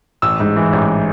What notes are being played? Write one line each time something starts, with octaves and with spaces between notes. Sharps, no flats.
A1 E6
G#2
E3
A1